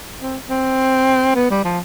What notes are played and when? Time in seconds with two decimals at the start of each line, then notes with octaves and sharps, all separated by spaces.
0.21 C4
0.50 C4
1.35 B3
1.50 G3
1.64 F3